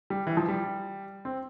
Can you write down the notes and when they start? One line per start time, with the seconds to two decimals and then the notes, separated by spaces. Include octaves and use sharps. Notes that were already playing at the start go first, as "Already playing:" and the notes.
0.10 G3
0.27 E3
0.37 F3
0.48 G3
1.25 C4